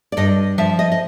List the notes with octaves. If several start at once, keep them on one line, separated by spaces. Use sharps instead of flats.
D5
G2 D#5
F3 E5
D#5
D#5